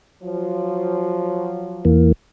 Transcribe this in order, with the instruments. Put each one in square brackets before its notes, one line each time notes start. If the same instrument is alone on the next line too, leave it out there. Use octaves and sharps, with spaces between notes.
[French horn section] F3 F#3
[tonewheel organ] E2 E3 A#3